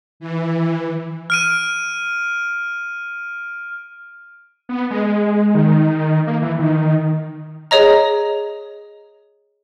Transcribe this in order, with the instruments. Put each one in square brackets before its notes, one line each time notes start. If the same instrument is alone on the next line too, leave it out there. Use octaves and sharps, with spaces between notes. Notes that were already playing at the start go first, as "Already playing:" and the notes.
[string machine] E3
[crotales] F6 D7 D#7
[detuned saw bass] B3
G#3
D#3
A#3
E3
D#3
[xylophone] G#4 C#5 D#5 A#5